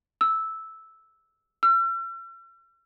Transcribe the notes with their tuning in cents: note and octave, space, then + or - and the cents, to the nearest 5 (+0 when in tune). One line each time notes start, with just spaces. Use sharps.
E6 -10
E6 +45